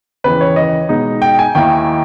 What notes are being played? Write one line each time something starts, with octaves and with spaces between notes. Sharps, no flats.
D#2 C#3 E3 B4
C#5
D#5
B2 G#3 D#4
G5
G#5
D#2 D#3 A#3 E4 G5